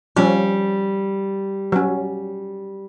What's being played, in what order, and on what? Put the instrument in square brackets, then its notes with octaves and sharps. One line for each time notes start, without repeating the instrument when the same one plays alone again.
[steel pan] F3 C#4 [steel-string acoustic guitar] G3
[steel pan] F#3 C#4